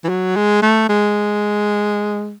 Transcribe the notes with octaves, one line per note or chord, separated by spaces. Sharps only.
E3
F#3
G#3
A3
G#3